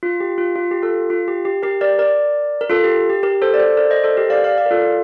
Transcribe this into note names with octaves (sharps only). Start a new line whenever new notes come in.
F4
G4
F4
F4
G4
F4 A4
F4
G4
G4
G4 A#4
A#4 D5
A#4 D5
A#4
F4 A4
G4
G4
G4 A#4
A4 C5
D5
A4 C5
A#4 D5
C5 D#5
A4 C5
G4 A#4
D5 F5
D5 F5
D5 F5
A#4
F4 A4